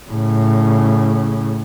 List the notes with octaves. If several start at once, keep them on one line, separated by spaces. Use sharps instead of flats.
A2 C#3